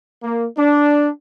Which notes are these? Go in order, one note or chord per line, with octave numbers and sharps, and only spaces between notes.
A#3
D4